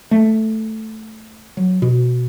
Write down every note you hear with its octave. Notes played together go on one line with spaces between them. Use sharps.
A3
F#3
B2